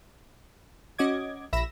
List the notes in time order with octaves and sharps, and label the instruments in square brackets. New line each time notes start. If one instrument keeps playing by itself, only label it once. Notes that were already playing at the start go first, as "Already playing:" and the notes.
[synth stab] C#4 F#4 D#5 D6 G#6
A#1 E5 B5 A#6 E7